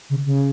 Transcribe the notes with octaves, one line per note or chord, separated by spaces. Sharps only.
C#3
C#3